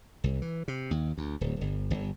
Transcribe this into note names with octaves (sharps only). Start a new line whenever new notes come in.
C2
E3
C3
D#2
D2
D1
G1
G1